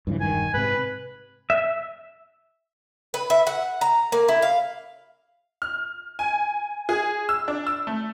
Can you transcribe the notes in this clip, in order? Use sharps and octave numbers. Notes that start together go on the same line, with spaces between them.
G2 C#3 E3
E1 G2 D#3 G#5
G#2 C3 B4
E5
B4
E5
F#5
A#5
A#3
E4
F5
F6
G#5
G#4
E6
D4
E6
A3